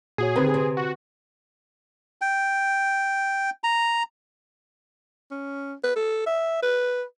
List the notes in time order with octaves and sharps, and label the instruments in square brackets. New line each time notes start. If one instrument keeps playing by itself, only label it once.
[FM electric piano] A#2 F#4 C#5 [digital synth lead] G#4
[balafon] D3 C4 [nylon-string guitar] D#3 B4 [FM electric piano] G4
[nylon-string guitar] C3
[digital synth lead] F#4
[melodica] G5
A#5
[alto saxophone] C#4
B4
A4
E5
B4